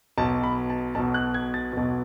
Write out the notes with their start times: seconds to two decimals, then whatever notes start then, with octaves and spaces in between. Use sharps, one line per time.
0.18 B1 A5
0.22 B2
0.44 B5
0.69 A5
0.95 B1 B2 A5
1.14 F#6
1.34 G#6
1.54 A6
1.73 B1 B2